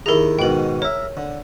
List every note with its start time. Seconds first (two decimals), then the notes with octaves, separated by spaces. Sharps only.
0.06 D#2 E4 G#4 A#4 A#5
0.39 G#2 B2 D#3 G5 F#7
0.82 A#4 C#5 E5
1.17 D3